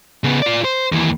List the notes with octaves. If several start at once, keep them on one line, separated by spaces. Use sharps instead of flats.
C#3 B3
F4 D5
C5
D#2 E3